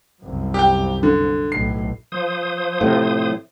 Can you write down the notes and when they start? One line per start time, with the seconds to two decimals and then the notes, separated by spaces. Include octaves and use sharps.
0.22 C2 F#2
0.54 G4 G5
1.03 D3
1.52 B1 A2 C7
2.12 F3 C5 D#6
2.81 A2 C3